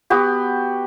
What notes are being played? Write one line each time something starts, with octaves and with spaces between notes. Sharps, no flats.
B3 F#4 G4